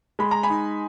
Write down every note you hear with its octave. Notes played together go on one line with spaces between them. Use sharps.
G#3 B5
A#5
G#5 B5
D#4